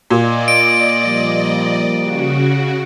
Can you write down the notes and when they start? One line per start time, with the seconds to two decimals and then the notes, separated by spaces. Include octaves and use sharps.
0.11 A#2 D5 D#5
0.48 D7
1.05 F3 G3 A#3
1.99 C#3 F#4